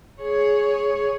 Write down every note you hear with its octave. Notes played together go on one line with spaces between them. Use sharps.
G#4 C#5